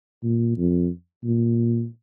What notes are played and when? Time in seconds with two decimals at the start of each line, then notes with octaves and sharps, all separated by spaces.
0.24 A#2
0.57 F2
1.25 A#2